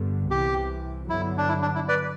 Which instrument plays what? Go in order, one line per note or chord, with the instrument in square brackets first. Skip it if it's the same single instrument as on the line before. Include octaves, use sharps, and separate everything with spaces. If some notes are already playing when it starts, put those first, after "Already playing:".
Already playing: [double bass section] G2 D3 G3 B3
[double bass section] C2 C3 E3 [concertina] G4
[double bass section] G2 D3 F#3 B3 [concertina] E4
[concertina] D4
E4
D4
E4
B4 D5